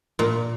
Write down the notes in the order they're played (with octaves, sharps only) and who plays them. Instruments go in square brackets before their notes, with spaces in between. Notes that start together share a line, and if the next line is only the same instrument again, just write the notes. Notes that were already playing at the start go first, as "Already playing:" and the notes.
[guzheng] A#2